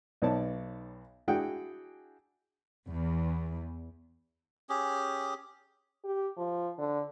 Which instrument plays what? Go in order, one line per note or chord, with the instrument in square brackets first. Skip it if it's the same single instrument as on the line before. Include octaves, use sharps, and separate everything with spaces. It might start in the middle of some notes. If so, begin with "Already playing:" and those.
[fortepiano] B1 B3 D#4 C#5 D5 A5
D4 E4 F#4 G#4 F#5 G5
[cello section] E2
[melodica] C#4 G4 G#4
[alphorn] G4
F3
D3